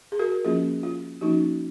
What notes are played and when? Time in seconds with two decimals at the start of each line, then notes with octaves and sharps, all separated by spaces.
0.12 G#4
0.19 F#4 A#4
0.45 F3 A#3 C#4 F4 G#4
0.83 F4
1.21 F3 A#3 C#4 D#4 F#4